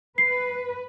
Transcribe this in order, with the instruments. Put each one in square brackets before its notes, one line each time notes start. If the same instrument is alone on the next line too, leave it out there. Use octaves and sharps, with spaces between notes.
[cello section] B4 [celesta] C7